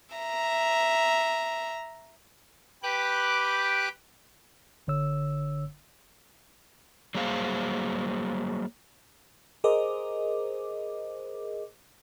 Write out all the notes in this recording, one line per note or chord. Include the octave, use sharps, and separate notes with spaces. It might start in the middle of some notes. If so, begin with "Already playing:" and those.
E5 A#5
G4 B4 G5 D6 F#6
G1 D3 C#5 E6
F#3 G3 A#3 G#4 C5 F5
G#4 A#4 C5 D#5 D6